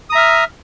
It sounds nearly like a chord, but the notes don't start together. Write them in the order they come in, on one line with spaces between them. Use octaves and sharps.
D#6 A#5 E5 F6